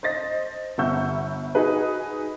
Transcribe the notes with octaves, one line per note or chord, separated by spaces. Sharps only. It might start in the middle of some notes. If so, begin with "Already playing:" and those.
C5 D#5 A6 A#6
G1 E5 F#5 C#6 E6 G6
D#4 F#4 G#4 B4